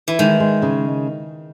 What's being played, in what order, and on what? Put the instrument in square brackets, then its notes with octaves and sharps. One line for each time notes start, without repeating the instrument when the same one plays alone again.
[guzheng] E3
[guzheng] D#3 [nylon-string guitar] G#3
[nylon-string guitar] G#3
C#3